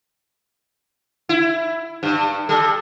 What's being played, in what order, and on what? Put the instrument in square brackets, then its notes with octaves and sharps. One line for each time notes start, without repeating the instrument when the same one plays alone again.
[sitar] E4
G2
[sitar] G3 [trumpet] A4